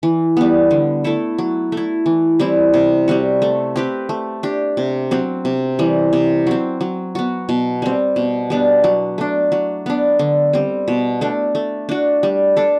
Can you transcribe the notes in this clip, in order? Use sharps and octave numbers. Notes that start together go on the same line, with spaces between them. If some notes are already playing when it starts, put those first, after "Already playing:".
E3
G3 B3
D3
A3 E4 A4
F#3
A3 E4
E3
G3 C4 E4
C3
G3 C4 F#4
A3
C4 G4 B4
A3
D4 G4
C3
F#3 C4
C3
E3 G3
C3
F#3 C4
F#3
B3 F#4
B2
G3 C4
B2
G3 B3 D4
F#3
A3 D4
F#3
B3 D4
D3
G3 C4
B2
A3 D4
A3
D4 F#4
G3
D4 A4